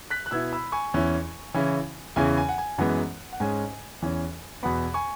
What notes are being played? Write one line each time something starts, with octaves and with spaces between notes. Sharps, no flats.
F#6 B6
F#6
B2 B3 E4 E6 G#6
B5 E6
G#5 C#6
E2 E3 C#4 E4
C#3 E3 C#4 E4
E2 C#3 E3 C#4 E4 G#5
G#5
F#5
G#5
F#2 E3 G#3 B3 F#5
F#5
G#2 G#3 C#4 G#5
E2 E3 C#4
E2 B2 B3 F#5 B5
G#5 C#6